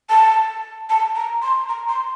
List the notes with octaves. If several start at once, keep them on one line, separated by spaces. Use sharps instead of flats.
A5
A5
A#5
C6
A#5
C6